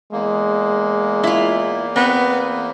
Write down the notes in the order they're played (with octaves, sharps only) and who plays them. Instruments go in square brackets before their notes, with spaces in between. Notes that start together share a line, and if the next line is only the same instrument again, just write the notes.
[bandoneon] E2 A#3 [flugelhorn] G#3
[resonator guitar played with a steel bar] E4 F4
[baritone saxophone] B3 [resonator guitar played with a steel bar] C4